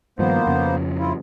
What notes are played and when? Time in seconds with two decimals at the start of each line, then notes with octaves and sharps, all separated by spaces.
0.19 G2 D#3 F3 A#3 B3 C5
0.47 F2 C#3
0.99 E4 F4